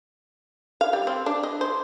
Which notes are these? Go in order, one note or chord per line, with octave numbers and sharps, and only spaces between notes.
F5
G3
C4
D4
D#5
C5